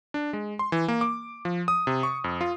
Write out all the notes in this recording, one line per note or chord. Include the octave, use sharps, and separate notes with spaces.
D4
G#3
C6
E3
A#3
D6
F3
D#6
C3
C#6
F2
F4